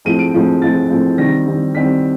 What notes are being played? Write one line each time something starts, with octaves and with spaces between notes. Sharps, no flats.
A2 F3 G#3 C4 D#7
D7
A2 F3 G#3 C4
A2 F3 G#3 C4 A6
A2 F3 G#3 C4
D#3 G3 C4 A#6
D#3 G3 C4
D#3 G3 C4 B6